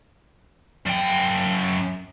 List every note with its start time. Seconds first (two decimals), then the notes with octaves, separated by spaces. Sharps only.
0.86 F#2 G5